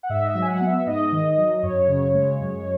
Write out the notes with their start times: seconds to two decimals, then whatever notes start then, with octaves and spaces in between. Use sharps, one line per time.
0.03 F#5
0.09 G#2 E5
0.24 D#5
0.29 E5
0.35 F#3
0.42 G#5
0.48 F#5
0.61 B3
0.67 E5
0.86 G#2 D#5
1.12 D#3
1.38 F#3
1.63 F#2 C#5
1.88 C#3
2.14 G#3
2.40 F#2